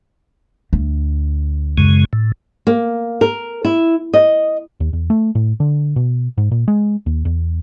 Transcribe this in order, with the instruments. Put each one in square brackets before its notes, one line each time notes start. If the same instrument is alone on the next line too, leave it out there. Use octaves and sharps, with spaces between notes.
[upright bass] D2
[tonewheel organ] F#2 C#3 G#3
A2
[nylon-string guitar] A#3
A#4
E4
D#5
[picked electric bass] D#2
E2
A3
A2
D3
B2
G#2
A#2
G#3
D#2
E2